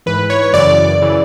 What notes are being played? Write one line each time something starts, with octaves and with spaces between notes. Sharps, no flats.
G#2 E3 B4
C#5
C#5
F#2 C#3 E3 D5
C#3 E3